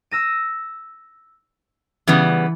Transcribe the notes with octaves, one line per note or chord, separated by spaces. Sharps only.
E6 A#6 D#7
C#3 E3 G3 B3